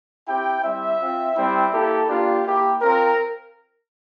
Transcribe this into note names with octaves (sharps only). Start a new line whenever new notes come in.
C4 E4 G4 G5
G3 C4 E4 E5
C4 F4
G3 C4 E4
A#3 E4 G4 A4
A#3 D4 F4 G4
A#3 E4 G4
C4 F4 A#4